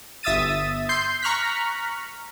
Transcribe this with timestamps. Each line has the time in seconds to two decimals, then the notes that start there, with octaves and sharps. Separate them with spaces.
0.23 G1 E5 D#6 E6 A6 D#7
0.89 C6 G6 C7
1.22 A#5 C#6 F6 F#6 B6